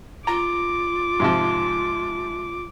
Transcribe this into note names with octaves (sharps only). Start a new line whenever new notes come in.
F4 A#5 D6
G#2 C3 F3